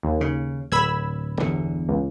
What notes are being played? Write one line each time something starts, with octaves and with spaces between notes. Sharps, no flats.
D#2
C#3
D1 B5 E6 G#6
G1 E2 D3
C#2